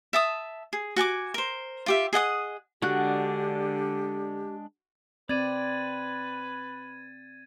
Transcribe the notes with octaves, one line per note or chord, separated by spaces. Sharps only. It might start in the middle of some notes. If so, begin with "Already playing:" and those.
E5 A5 D#6
G#4
F#4 G#5 A5 D6
A#4 C5
F4 G4 E5
G#4 D#5 F#5 D#6
D3 G#3 D4 F#4 G4 F#6
C4 B4 D5 G#6 A6 D#7